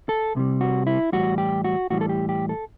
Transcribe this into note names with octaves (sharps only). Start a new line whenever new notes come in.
A4
C2 C3 G3
F#4
E4
A2 E3 G3 F#4
G4
F#4
A2 E3 G3 F#4
A4
G4
G4
A4